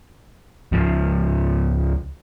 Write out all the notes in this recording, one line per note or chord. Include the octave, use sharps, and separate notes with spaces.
C#2 C#3 F3